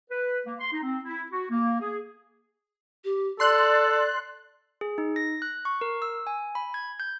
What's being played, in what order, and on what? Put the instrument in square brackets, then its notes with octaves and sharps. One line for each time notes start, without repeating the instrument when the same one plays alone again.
[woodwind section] B4
A#3
C6
D#4
C4
E4
F#4
A#3
G#4
[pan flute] G4
[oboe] A4 [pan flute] D5 [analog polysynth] C6 F#6
[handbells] G#4
D#4
A#6
F#6
C#6
A#4
E6
G#5
B5
G#6
G6